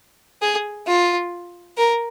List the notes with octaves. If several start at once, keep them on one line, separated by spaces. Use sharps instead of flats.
G#4
F4
A#4